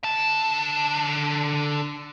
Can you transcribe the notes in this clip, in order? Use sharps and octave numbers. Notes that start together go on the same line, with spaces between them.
D3 A5